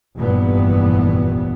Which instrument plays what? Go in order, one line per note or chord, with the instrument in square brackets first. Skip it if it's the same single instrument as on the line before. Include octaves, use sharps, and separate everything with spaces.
[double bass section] F1 A#1 G2 A#2 E3 B3